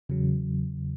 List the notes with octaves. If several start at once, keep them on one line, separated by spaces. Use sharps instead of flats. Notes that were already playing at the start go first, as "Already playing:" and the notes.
E2 C#3 F#3